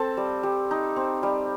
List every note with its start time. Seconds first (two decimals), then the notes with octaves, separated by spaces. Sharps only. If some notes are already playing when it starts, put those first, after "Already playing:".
Already playing: C4 A4 A5
0.17 G3
0.43 G3
0.71 D#4
0.96 C4
1.23 G3